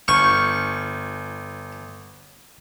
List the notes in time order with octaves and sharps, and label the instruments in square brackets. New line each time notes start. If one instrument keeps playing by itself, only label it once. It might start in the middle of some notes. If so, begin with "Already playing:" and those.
[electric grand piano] G1 [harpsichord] C#6 [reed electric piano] F6 G6